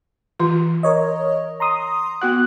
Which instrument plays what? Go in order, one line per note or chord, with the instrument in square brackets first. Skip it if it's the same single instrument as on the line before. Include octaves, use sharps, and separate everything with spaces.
[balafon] E3 F4
[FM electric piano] A#4 C#5 D#5
A#5 C6 D#6
[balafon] B3 F#4 F#5 [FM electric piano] F#6